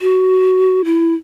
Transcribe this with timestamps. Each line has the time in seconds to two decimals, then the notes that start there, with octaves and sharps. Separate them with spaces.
0.01 F#4
0.85 E4